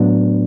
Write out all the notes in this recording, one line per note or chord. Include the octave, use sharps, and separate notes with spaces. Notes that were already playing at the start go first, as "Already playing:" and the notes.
Already playing: A2 F#3 B3 D4